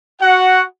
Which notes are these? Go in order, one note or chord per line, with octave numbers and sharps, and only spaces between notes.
F#4 F#5